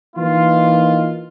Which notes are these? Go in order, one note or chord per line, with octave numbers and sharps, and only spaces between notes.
E3 A#3 D#4 F4